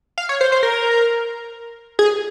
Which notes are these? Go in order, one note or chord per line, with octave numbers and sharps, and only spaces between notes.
F5
C#5
C5
C5
A#4
G#4